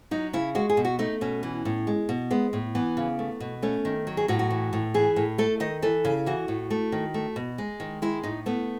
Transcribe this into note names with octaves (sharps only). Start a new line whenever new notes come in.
F#3 D#4
C#3 E4
G#3 F#4
G#4
B2
F#4
A3 D#4
B2 C#4
E3
A2
G#3
B2
G#3 B3
A2
E3 B3
C#3
A3
B2
A3 C#4
D#3
F#3
G#4
A2 F#4
F#4
E3
A2
E3 G#4
A2
A3 A4
D#3 D#5
E3 A4
C#3
E3 F#4
A2
A3
D#3
A3
B2
G#3
D#3
G#3 E4
A2 D#4
A3 B3